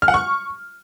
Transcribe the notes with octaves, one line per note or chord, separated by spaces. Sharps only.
F6
F#5
C#6